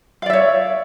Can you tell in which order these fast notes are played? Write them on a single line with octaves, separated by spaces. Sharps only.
F5 D5 E5 C#5